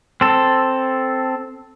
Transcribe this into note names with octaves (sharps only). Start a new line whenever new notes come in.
C4 A4